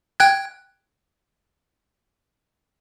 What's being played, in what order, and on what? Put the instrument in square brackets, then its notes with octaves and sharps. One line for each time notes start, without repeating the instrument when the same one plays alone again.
[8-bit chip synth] G5 F#6 G#6